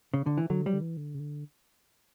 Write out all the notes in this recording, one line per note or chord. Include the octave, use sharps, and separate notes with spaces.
C#3
D3
E3
D3 F#3
F#3 G3
D3
E3
D3
C#3
D3